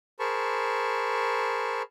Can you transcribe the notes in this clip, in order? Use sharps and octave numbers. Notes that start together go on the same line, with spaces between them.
G#4 A#4 C5 A5 B5 C#6